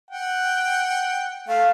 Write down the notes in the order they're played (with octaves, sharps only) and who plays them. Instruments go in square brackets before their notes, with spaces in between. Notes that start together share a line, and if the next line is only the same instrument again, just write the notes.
[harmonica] F#5 G5
[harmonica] A3 [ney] F5